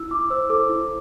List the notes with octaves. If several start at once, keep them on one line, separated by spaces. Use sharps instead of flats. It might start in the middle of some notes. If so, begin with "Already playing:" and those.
Already playing: E4 E6
E4 D6
C5 E6
A4 D6
E4